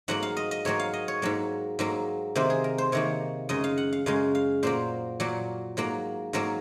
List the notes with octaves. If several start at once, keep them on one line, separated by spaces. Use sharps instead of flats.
G#2 F#3 A#3 F#5
F5
D#5
D#5
G#2 F#3 A#3 C#5
F5
D#5
C#5
G#2 F#3 A#3
G#2 F#3 A#3
C3 D#3 A#3 C5
G#4
A#4
C5
C3 D#3 A#3 C#5
F#2 C#3 G#3 D#5
F5
F#5
F5
F#2 C#3 G#3 F5
F5
A#2 F#3 A#3 C5
A#2 F#3 A#3
G#2 F#3 A#3
G#2 F#3 A#3 A#4